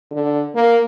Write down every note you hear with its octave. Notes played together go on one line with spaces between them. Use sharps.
D3
A#3